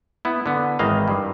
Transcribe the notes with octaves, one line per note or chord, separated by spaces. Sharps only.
B3 E4
D3 B3
G#1 D#3 E3 D#5 F5
G2